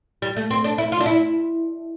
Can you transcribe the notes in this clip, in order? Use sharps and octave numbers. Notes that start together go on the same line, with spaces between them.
G3
A3
C4
D4
E4
F4
D4
E4